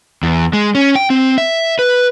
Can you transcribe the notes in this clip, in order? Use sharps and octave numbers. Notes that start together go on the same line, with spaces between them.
E2
G#3
C#4
G5
C4
E5
B4